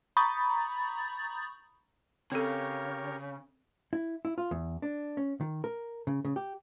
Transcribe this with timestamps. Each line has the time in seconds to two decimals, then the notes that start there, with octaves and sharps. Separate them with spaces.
0.17 A#5 B5 C#6 D#6 G6 A6
2.32 C#3 C4 G4 A4 A#4 C#5
3.93 E4
4.25 E4
4.38 F4
4.51 E2
4.82 D4
5.17 C#4
5.41 D#3
5.64 A#4
6.07 C#3
6.25 C#3
6.36 G4